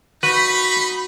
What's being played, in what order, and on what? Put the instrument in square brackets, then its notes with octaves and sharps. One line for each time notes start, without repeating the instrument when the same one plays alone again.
[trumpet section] D#4 [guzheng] F#4 [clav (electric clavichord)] B4 [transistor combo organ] B5